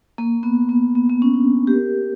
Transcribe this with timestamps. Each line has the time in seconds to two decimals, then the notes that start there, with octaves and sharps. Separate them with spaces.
0.18 A#3
0.43 B3
0.69 B3
0.95 B3
1.09 B3
1.22 C#4
1.34 D4
1.67 G4
1.73 A#4